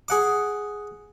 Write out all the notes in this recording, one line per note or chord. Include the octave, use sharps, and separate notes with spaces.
G#4 F#5 D6